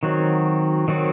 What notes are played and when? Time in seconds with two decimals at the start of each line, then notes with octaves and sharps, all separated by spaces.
0.03 D#3 F#3 C4 F#4
0.88 D#3 F#3 C4 F#4